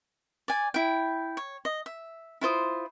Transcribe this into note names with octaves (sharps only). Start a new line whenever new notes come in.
D5 G#5
E4 G5
C#5
D#5
E5
E4 F4 C5 D#6